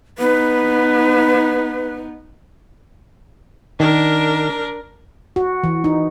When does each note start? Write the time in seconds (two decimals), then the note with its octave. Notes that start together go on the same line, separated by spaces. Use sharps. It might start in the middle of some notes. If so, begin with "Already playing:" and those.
0.18 B3 D#4 B4
3.80 D#3 D4 A#4
5.36 F#4
5.64 E3
5.84 D#4